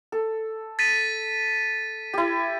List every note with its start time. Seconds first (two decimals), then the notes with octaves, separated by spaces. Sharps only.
0.12 A4
0.79 A6 B6 D#7
2.14 E4 G4